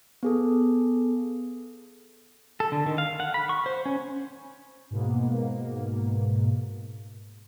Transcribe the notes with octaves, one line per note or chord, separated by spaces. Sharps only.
B3 G#4 A4
A4
D3
D#3
F5
F#5
B5
C#6
C5
C#4
G#2 B2 A#3 B3